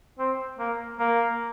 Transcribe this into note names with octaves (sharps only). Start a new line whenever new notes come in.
C4
A#3
A#3